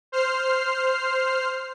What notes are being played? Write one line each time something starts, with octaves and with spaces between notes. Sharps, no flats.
C5 F6 C7